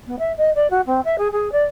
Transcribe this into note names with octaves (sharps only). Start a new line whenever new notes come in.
B3
E5
D#5
D5
F#4
C4
E5
G#4
G#4
D5